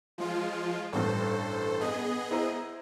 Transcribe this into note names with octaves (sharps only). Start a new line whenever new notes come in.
F3 G#3 F4
A1 G2 A4 C5
B3 G#4 D#5
E4 C5 A#5